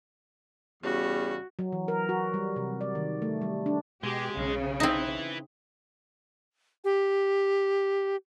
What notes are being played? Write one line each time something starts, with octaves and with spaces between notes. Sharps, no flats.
E2 C#3 G3 F#4
F#3
E3
A#4
F#4
G3
C3
D5
D#3
A3
G3
D4
B2 G#3 G4
B1 C#3
C4 D#4 E4 B4
G4